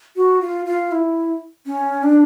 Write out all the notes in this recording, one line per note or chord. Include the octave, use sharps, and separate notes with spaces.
F#4
F4
F4
E4
C#4
D4